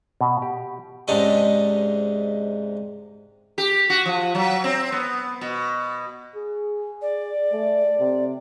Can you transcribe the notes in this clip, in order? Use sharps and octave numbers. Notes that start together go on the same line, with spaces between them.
B2
G4
G#2 C3 C#4 D4 D#5
G4
F#4
F3
F#3
C4
B3
B2
G#4
D5
A3
C3